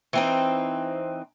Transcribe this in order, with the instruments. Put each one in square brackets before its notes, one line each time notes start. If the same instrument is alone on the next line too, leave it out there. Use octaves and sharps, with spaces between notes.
[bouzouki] E3 C4 D#4